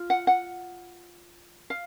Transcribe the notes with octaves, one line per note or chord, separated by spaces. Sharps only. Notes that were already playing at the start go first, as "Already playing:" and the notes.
Already playing: F4
F#5
F#5
F5